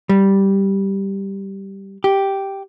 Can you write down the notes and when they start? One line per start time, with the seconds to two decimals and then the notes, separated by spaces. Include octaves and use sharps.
0.09 G3
2.04 G4